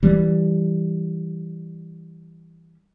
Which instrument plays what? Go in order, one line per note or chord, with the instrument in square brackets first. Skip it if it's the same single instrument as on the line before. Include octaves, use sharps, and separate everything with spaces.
[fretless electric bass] E3 G3